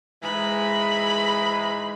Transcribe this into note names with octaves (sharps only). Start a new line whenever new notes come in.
G#2 E3 G#3 B5